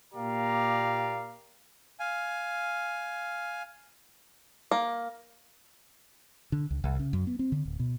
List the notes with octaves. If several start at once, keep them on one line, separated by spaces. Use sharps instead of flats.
A#2 A#3 G4 D5 F5 A#5
F5 G#5
A#3
D3
C#2
C2
C#3
F#2
B3
C4
D3
D1
B2